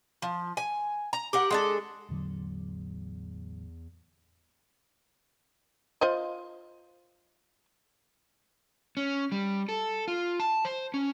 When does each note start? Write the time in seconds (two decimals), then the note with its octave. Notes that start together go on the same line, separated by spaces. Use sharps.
0.22 F3
0.57 G#5
1.13 A#5
1.33 G4 A#4 F#5
1.51 G#3 D4 A4
2.09 A1 E2 D3 F#3
6.01 F4 C5 D#5
8.97 C#4
9.32 G3
9.69 A4
10.08 F4
10.40 A5
10.65 C5
10.94 C#4